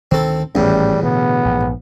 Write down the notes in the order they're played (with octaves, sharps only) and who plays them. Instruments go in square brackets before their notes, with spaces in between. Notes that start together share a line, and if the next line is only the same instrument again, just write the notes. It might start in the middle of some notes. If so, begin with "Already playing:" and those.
[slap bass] D2 D#3 [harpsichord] C4 A4
[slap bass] G#1 A3 C#4 [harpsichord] E2 A2 [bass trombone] G3
[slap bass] B2 D3 [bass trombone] B3
[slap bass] A#1 G#2